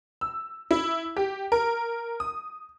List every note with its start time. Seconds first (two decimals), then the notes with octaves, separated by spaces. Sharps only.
0.21 E6
0.71 E4
1.16 G4
1.52 A#4
2.20 D#6